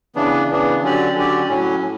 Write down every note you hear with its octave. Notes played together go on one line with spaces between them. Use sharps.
C#3 E3 B3 D4
C#3 E3 B3 D4
D3 F#3 C#4 G4 D5
D3 F#3 C#4 G4 D5
A2 F#3 C#4
A2